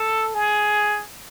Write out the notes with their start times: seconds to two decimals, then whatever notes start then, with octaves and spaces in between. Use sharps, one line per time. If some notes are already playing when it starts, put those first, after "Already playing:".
Already playing: A4
0.34 G#4